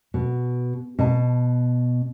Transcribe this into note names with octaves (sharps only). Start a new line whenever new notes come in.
B2
B2 A5